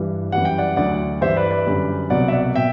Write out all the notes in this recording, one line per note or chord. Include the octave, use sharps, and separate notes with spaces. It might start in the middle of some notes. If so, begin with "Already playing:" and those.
Already playing: G2 E3 G3
F#2 E3 G3 F#5
G5
D5 F#5
D2 D3 F#3 D5 F#5
G2 E3 G3 C5 E5
B4 D5
B4 D5
F#2 D3 G3
C2 B2 F#3 D5 F#5
E5
D5 F#5
B2 E5 G5